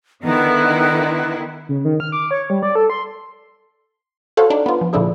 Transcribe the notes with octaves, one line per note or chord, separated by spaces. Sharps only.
D3 D#3 B3 E4
C#3
D#3
F6
D6
C#5
G3
D5
A4
C6
F#4 A4 C5 C#5 F5 F#5
D4 D#4
B3 F4
F3
A#2 D3 F3 D4 E4 G#4